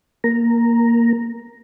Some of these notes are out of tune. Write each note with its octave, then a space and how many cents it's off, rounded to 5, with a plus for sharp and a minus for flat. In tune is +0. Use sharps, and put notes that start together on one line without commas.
A#3 +0 A#5 +0